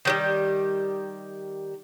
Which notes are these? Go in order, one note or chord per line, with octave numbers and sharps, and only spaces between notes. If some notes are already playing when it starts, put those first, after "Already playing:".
D#3 F#3 G3